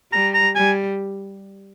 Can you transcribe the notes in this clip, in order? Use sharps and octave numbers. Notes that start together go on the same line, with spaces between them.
G3 A#5
A#5
G3 G#5